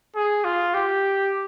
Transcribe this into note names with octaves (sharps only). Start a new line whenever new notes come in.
G#4
F4
G4